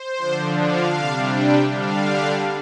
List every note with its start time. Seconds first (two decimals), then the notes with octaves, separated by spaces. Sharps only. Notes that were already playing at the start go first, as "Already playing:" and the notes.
Already playing: C5
0.18 D3 F3 D4
0.56 F5
0.94 C3 G3 D4
1.32 G5
1.71 D3 G3 D4 F5